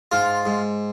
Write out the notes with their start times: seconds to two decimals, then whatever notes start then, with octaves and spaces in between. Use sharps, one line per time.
0.12 G#2 F4
0.45 G#2